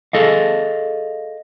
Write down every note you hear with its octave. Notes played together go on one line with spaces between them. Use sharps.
G#4 A4 D#5 F5